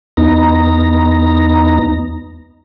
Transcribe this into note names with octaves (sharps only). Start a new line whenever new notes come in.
E2 B3 D#4 A#5